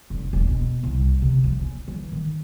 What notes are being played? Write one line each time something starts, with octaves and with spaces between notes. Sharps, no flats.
F1
E1
B2
C2
C3
F3
C#4
E3
D#3